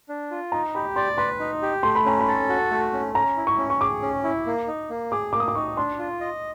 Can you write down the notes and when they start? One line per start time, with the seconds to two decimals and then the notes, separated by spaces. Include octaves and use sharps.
0.09 D4
0.31 F4
0.52 D#4 A#5
0.75 G4 B5
0.96 D5 C6
1.18 B4 C6
1.40 D#4
1.62 G4
1.83 A3 C6
1.95 B5
2.05 C#4 A#5
2.19 B5
2.27 A4
2.49 F#4
2.70 A3
2.93 C#4
3.15 C#4 A#5
3.37 E4
3.47 C#6
3.58 C#4
3.70 C#6
3.81 G#4 D6
4.02 C#4
4.24 E4
4.46 A#3
4.67 D#4
4.90 A#3
5.12 G#4 D6
5.33 A#3 D6
5.40 D#6
5.48 D6
5.55 D#4 C#6
5.77 D4 C6
5.99 F4
6.20 D#5